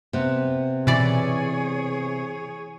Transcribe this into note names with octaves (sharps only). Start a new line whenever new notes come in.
C3 B3
B2 E3 G#4 C#5 D5